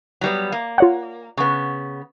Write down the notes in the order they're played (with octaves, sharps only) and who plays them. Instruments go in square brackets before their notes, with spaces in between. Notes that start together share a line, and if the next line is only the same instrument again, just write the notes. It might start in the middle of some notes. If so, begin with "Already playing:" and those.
[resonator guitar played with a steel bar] F#3 G3 B3
A#3
[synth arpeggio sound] F4 C#5 F#5
[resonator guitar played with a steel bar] C#3 B3